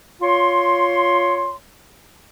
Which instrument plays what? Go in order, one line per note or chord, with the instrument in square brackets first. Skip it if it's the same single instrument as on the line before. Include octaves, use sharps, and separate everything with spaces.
[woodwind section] F4 C#5 C6